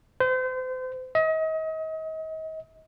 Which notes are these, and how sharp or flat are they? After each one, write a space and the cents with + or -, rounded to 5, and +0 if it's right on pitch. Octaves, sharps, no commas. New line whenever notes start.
C5 -35
D#5 +35